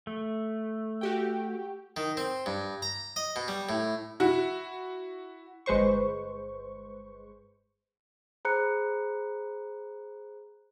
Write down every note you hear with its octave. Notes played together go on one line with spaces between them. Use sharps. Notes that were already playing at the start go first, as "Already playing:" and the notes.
A3
F#4 G4 G5
D#3
C4
G2
A#5
D#5
B2
G3
A2
E4 F#4
G1 G#3 B4 C5 C#6
G#4 C5 A#5 B5 F#6 C#7